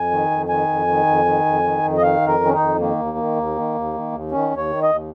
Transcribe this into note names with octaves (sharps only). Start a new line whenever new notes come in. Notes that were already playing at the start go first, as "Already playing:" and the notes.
Already playing: F2 G#5
D#3
F2
D#3 G#5
F2
D#3
F2
D#3
F2
D#3
F2
D#5
D#3 F5
F2
A#4
D#3
C#4
D#4
F2
D#3 A#3
D#2
D#3
D#2
D#3
D#2
D#3
D#2
D#3 C#4
D#2
C#5
D#3
D#5
D#2